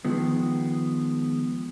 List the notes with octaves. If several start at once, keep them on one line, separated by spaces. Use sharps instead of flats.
D#3 F3 G#3 B3